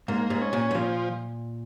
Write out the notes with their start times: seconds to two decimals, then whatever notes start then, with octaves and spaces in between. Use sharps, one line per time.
0.08 G#2 A#3
0.30 G#2
0.41 C#4
0.53 A#2
0.71 G#2
0.75 A#2 F3